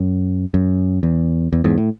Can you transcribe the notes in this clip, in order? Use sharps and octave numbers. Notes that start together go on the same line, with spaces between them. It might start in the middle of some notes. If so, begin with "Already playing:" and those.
Already playing: F#2
F#2
E2
E2
E2 G#2
A2